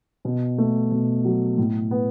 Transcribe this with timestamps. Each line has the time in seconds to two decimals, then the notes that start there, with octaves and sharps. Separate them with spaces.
0.25 B2
0.58 A3
0.91 B2
1.25 F#3
1.58 A2
1.91 B3